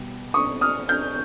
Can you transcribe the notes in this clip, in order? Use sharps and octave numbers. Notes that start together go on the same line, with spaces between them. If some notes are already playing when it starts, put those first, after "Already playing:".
Already playing: B2 G3
C#6 D#6
D#6 F6
F6 G6